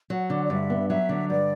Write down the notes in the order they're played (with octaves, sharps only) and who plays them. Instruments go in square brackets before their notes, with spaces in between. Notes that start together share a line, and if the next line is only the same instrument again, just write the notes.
[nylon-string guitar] F#3 [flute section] F#5
[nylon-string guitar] D3
[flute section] D5
[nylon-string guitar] G2 [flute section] E5
[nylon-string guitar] B3
[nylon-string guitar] F#3 [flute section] E5
[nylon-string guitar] D3
[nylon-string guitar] G2 [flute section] D5